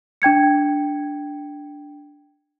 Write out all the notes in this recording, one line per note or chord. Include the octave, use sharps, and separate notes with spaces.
D4 G5 G#6 C#7